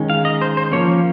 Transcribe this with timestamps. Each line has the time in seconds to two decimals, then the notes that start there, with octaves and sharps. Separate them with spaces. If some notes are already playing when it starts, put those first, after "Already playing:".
Already playing: D#3 G#3 C#4
0.10 F5
0.25 D#5
0.41 C5
0.57 C5
0.72 F3 A#3 C#4 C#5